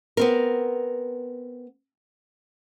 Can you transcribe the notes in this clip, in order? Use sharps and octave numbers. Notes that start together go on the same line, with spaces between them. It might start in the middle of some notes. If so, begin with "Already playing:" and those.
B3 C4 A#4